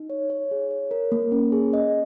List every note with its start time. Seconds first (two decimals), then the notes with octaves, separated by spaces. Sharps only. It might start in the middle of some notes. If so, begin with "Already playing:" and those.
Already playing: D#4
0.10 C#5
0.30 C#5
0.51 G#4
0.71 C#5
0.91 A#4
1.12 A#3
1.32 C#4
1.52 G#4
1.73 D#5